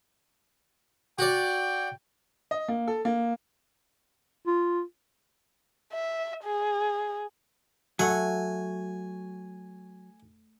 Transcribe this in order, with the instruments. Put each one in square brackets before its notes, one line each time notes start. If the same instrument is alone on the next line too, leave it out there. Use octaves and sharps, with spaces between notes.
[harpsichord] F#4 D5 [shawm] G5
[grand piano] D#5
A#3
A4
A#3
[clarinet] F4
[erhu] E5
G#4
[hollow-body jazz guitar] F#3 [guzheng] A3 F#5 [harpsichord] G#5